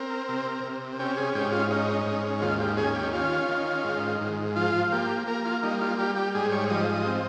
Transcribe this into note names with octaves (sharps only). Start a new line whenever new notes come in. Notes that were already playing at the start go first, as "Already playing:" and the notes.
Already playing: C4 A#4
C3
C3
C#4 G4
G#4
G#2 G4
F4
C#4 D#4
G#2
D#2 F4
G4
C#4 G#4
G4
C#4 F4
D#3
G#2
G#2
F3 F4
A#3 G4
A#3 A#4
F4
G3 D#4
F4
G3 G4
G4
G#2 G#4
C#5
F3 D#5
D#5
C4